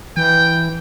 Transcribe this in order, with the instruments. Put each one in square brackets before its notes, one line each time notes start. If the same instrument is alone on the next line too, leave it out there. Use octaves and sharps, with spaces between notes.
[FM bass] E3 [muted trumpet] G5